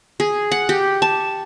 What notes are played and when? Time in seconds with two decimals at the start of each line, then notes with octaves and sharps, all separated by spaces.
0.20 G#4
0.51 F#5
0.69 G4
1.02 A5